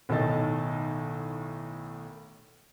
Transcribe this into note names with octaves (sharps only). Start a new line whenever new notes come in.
B1 A2 D#3 A4 D#5 A6